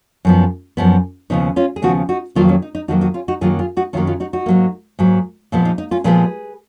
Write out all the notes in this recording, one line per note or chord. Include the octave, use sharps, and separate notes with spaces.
F#2 F3 B3
F#2 F3 B3
D#2 C#3 F3 B3 D#4
C#4 F4
G#4
D#2 C#3 F3 B3 D#4 F#4
D#4 F#4
F2 D#3 F#3 A#3 C#4 F4
C#4
D#4
D#4
F2 D#3 F#3 A#3 D#4 F#4
D#4 F#4
C#4 F4
D#4 F#4
F#2 D#3 F#3 A#3 F4 G#4
F4 G#4
D#4 F#4
F#2 D#3 F#3 A#3 C#4 F4
C#4 F4
D#4 F#4
D#4 F#4
G#2 F#3 A#3
G#2 F#3 A#3
A#2 F3 G#3 B3
D#4
D#4
C#4 F4
A#2 F3 G#3 B3 G#4 B4